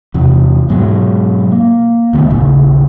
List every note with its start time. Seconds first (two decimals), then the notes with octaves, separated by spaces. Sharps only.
0.14 E2 C3
0.69 G#2 B2 F#3
1.52 A#3
2.13 D2 D#3 A3 B3
2.30 D#1 A#1 A2 C#3